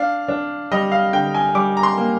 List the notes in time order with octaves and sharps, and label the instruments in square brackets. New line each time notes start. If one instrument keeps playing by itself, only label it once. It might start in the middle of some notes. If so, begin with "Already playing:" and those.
Already playing: [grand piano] D4 F5
D4
G3 D#5
F5
D3 G5
G#5
G3 D6
A#5
C6
A#3